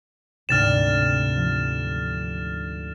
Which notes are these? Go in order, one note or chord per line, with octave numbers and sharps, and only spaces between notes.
D2 G#2 C3 F6 A6 E7
F3